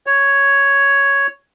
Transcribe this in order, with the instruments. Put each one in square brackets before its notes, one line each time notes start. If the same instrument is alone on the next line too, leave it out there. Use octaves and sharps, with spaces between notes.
[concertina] C#5